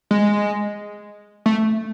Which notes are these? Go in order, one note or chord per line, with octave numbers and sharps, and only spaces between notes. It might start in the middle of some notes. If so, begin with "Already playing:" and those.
G#3
A3